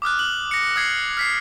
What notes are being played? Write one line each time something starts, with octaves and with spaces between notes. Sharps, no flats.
D6 D#6 F6 F#6
F#7
A#6 C#7
D#6 F6 G#6 C7
F6 B6 C7